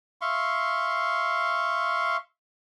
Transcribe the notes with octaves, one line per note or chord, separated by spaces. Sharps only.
E5 F5 C6 C#6